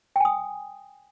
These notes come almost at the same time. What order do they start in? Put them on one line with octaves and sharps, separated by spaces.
G5 G#5 D#6